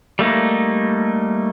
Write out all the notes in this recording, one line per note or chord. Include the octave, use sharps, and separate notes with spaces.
G3 A3 A#3 D#4